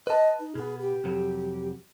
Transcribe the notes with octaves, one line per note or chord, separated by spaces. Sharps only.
B4 D#5 A5
D#4
B2 B3 G#4
G4
C2 F2 F#3